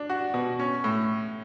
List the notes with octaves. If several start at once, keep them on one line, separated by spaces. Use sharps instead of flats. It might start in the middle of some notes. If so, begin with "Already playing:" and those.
Already playing: D4
F#4
B2
C#4
A2